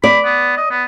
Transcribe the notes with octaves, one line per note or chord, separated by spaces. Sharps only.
D5 B5
B3
D#5
B3